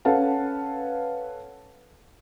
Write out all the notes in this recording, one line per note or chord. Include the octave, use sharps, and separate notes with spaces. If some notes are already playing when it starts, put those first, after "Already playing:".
C#4 A4 B4 F5 F#5 A5